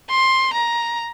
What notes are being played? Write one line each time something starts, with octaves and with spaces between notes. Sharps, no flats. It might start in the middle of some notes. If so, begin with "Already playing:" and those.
C6
A#5